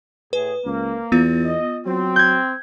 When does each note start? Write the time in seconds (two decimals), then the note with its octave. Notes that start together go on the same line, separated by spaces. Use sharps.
0.33 A2 G#4 B4
0.65 C#2 A#3
1.12 E2 B3 F4
1.44 D#5
1.86 F#3 C4
2.16 G6 G#6